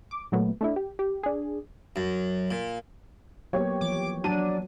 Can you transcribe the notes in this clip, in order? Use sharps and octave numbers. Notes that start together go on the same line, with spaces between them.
D6
A#2 F#3 A3 B3
A3 D4 E4
G4
G4
D4 G#4
F#2
A#2
F#3 A#3 B3 G4 C#5
E3 F3 D6
F#3 D4 F#4 C#5 D#7